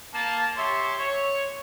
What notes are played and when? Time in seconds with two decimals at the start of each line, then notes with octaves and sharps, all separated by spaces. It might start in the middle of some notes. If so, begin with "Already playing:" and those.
0.14 A#3 A5
0.57 G4 C#5 E5 C6
0.99 C#5